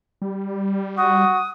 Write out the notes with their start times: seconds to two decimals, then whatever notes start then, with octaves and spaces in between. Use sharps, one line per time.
0.22 G3
0.98 F#4 D#6